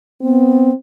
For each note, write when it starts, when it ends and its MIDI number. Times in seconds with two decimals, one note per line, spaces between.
0.22 0.71 59
0.22 0.74 60